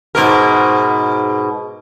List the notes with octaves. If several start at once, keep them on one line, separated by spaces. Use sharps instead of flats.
G#2 B2 A#4